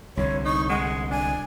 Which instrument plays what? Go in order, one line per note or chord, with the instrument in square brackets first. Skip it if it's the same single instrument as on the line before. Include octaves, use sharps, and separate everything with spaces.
[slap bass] C2 D3 [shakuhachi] C#5
[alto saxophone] D#4 [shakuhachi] C#6
[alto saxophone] G#3 [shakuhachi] F#5
[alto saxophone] D4 [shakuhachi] G#5